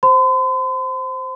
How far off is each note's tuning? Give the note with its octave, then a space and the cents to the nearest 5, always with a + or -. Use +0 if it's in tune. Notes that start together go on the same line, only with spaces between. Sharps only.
C5 +0 C6 -45